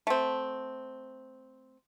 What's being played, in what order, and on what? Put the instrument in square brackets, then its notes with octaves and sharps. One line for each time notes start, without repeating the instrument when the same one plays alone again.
[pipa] A3 C4